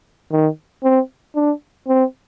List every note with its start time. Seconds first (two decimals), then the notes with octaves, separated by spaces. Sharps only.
0.32 D#3
0.83 C4
1.36 D4
1.88 C4